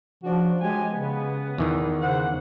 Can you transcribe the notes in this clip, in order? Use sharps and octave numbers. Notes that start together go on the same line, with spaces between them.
C#3 F3 D4 F#4
F#3 G#3 G4 G#5
C#3 B3
E2 D#3 E3
C#3 C5 F#5